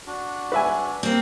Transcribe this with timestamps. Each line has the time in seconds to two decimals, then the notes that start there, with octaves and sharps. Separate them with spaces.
0.07 D4 F#4
0.52 B4 E5 G#5
1.03 A#3 C4